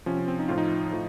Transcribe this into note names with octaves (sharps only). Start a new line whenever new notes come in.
C3 F3 C#4
C4
C4
D#4
A2 F3 F4
D#4
A2 F3